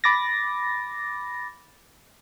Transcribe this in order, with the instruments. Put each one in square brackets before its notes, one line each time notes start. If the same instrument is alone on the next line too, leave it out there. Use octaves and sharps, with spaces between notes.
[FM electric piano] B5 D6 A6 A#6